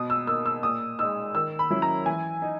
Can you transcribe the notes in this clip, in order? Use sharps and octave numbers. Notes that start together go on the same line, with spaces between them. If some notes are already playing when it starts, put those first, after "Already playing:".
Already playing: B2 D#6
E6
A#3 D#4 E6
E6
A#2 D#6
G#3 D#4 E6
D#3 E6
B5
F#3 C#4 E4
A#5
E3 G#5
D#4